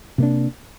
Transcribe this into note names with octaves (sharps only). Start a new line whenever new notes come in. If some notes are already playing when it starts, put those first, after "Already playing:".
C3 A#3 D4